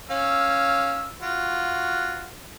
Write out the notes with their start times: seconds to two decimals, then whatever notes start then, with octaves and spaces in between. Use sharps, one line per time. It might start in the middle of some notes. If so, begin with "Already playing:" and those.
0.11 C#4 F5 E6
1.21 F4 F#4